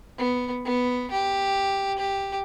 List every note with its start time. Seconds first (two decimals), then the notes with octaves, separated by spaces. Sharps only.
0.18 B3
0.65 B3
1.11 G4
1.98 G4